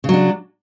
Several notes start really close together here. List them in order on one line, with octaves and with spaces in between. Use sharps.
C#3 F#3 D4